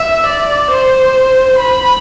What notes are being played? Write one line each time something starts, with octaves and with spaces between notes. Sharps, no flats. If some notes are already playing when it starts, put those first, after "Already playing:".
Already playing: E5
D5
C5
B5